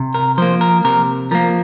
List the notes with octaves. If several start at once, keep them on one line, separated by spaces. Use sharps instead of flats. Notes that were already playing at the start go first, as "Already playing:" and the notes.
Already playing: C3
A#4
F3 A#3 C5
A#4
C3 A#4
F3 A#3 A#4